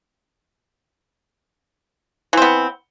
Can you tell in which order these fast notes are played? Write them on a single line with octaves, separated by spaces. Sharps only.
E3 C4 B3